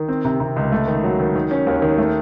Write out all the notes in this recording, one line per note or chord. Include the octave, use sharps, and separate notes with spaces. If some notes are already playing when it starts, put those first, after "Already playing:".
Already playing: D#3
C4
C3
C3
C#2
A3
D#3
F#3
D#3
D#3
C#4
D#2
D#3
A3